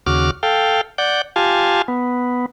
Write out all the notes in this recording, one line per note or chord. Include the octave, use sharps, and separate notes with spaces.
D#2 C#3 F#4 D6 F6
A4 F5 G5
D5 F#5 G6
F4 G4 F5 G#5 A5
B3